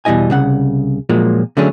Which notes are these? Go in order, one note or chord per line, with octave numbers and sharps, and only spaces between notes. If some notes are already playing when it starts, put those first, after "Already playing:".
E2 B2 G3 E4 D#5 G#5
C2 C#3 F#5
A#2 F3 F#3 G#3 A#3
D3 F#3 A3 C#4 D4 G#4